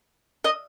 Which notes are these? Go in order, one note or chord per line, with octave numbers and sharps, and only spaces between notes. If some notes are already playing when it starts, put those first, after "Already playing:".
D#5